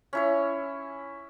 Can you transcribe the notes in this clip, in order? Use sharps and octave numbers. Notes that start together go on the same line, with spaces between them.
C#4 E4 C#5